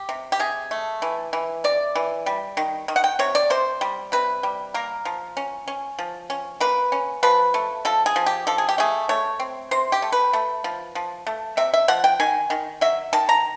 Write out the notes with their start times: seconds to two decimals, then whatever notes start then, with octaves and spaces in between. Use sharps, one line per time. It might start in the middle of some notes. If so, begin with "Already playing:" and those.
Already playing: G4
0.09 C3
0.32 G4
0.40 C3 G#4
0.71 A3
1.02 E3
1.33 E3
1.64 C3 D5
1.95 E3
2.26 G3
2.57 D#3
2.88 D#3
2.96 F#5
3.04 G5
3.19 C3 C#5
3.35 D5
3.50 C3 C5
3.81 G3
4.12 C3 B4
4.43 G3
4.74 A#3 A#4
5.05 F3
5.37 C#4
5.68 C#4
5.99 F3
6.30 C#4
6.60 A#3 B4
6.92 C#4
7.23 F3 B4
7.54 A3
7.85 F3 A4
8.06 G#4
8.16 F3
8.26 G4
8.47 F3 A4
8.58 G#4
8.69 G4
8.78 A3 G#4
9.09 A3 C#5
9.40 C4
9.71 C3 C5
9.92 G4
10.02 A3
10.12 B4
10.33 A3
10.64 F3
10.95 F3
11.27 A3
11.57 C3 E5
11.74 E5
11.88 F3 F#5
12.04 G5
12.20 D#3 G#5
12.50 D#3
12.81 F#3 E5
13.13 D#3 A5
13.29 A#5